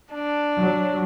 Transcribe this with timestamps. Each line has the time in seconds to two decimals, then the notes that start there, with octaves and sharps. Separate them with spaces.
0.13 D4
0.59 F#3